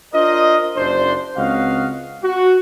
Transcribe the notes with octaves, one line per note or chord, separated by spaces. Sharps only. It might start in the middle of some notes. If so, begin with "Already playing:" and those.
D4 F4 A#4 C5 D#5
F#1 D4 C5
C#2 C4 F#4 D#5 F5
F#4